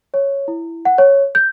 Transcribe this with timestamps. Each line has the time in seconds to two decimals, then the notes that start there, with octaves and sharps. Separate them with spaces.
0.14 C#5
0.48 E4
0.85 F#5
0.98 C#5
1.35 G6